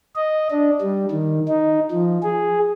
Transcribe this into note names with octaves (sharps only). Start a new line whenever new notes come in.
D#5
D4
G3
D#3
D#4
F3
G#4